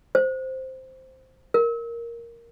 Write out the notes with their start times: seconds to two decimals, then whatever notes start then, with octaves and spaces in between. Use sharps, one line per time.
0.15 C5
1.54 A#4